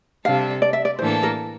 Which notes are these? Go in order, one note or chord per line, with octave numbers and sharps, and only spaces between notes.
C3 G3 D4 A4 F5
D5
E5
D5
A2 E3 A#3 D4 A4 C5
A#4